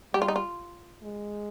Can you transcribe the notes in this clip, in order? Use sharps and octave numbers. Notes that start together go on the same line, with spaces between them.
G3 G4
F4
D#4
F4
G#3